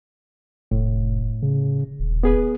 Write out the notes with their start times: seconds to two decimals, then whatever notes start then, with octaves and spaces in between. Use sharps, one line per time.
0.71 F1 A2
1.42 C#3
2.00 D#1
2.23 B3 G#4 B4